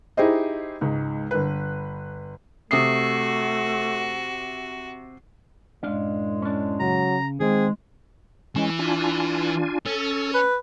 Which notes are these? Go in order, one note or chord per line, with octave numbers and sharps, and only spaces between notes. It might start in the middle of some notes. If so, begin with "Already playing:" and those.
D#4 E4 G4 G#4 C5 D#5
C#2 G#2
G1 B4
C3 A3 F#4 D#6 C7
F#2 A2 G#3 D4 F5
C#4 D4
C#3 F#3 A#5
D#3 G#3 C4 G#4
E3 G#3 C#4
D4 F4 G#5
C#4 A4
B4